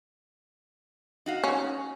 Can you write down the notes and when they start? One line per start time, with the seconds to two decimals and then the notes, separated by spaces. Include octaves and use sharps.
1.26 D#4 F#4 F5
1.44 C#4